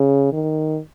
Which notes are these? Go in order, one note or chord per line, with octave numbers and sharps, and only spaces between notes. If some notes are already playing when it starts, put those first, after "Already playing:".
Already playing: C#3
D#3